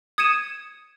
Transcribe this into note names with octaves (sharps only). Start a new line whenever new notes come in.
D#6 G#6 C#7 D#7 E7